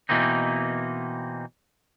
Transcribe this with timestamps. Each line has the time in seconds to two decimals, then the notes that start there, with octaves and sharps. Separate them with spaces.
0.09 B2 E3 A#3 C4 D#4